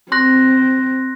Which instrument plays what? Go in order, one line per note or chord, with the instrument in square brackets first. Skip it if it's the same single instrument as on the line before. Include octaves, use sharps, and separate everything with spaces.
[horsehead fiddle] C4 [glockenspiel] C6 F#6 A#6